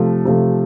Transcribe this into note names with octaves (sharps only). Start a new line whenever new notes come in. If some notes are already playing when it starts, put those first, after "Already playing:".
Already playing: C3 F3 A3
C3 F3 A3